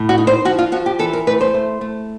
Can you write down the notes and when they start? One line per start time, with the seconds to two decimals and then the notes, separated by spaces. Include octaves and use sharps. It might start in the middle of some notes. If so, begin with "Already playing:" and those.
Already playing: A2
0.09 F#4
0.18 D#4
0.27 C5
0.45 F3 F#4
0.59 F4
0.72 F3 F#4
0.86 G4
0.99 E3 A4
1.13 A#4
1.27 A3 B4
1.41 C5
1.54 A3
1.81 A3